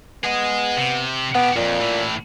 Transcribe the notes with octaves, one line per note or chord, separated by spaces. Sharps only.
B3 G#4 D#5
C3
B2 B3 G4
F2 A#2
A2 E3